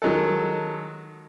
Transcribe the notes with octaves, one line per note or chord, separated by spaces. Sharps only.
D#3 F#3 G#3 A4